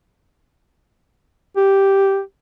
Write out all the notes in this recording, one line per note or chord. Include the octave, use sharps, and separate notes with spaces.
G4